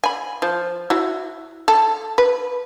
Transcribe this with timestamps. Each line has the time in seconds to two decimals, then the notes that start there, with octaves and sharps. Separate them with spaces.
0.04 G#5 B5
0.42 F3
0.90 E4 F#4
1.68 A4
2.18 B4